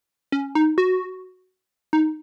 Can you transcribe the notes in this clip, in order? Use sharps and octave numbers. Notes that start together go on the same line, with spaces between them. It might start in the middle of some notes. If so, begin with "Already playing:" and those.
C#4
D#4
F#4
D#4